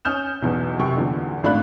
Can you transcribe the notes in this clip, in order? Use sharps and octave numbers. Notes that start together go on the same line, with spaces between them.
C#4 D#6 F6 G6 E7
B1 E2 B2
F#2 C3 G5 C#6
E2 A#2 D3
G#1 A2 D4 F5 B5 F#6